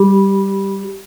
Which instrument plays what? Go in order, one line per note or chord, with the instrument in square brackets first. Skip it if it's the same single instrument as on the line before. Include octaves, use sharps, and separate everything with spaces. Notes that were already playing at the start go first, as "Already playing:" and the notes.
Already playing: [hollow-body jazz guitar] G3